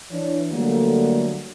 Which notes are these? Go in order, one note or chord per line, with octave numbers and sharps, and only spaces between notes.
E3 D4 C#5
D3 F#3 G3 A3 A#3